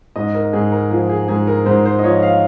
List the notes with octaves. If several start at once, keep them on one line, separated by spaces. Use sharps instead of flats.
G#2 D#5
A#4
G#2 G#4
A#4
F3 G#4
G#4
G#2 G#4
A#4
G#2 C5
C5
D#5
F3 C#5
F5